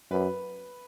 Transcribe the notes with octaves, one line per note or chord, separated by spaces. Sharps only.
F#2 B4